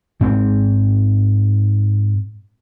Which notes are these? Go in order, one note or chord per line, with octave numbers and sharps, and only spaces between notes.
G#2 C4